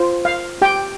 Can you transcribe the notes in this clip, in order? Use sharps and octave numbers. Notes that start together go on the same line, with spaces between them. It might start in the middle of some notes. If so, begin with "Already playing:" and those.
Already playing: F4 C5
F5
G4 G5